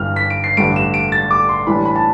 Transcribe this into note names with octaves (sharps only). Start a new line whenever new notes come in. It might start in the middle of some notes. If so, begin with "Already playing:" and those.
Already playing: G1 G2 E3 G3 F6
B6
D7
C7
A1 G2 D3 G3 D7
E7
D7
A6
D6
C6
A2 E3 G3 D4 B5
B5
A5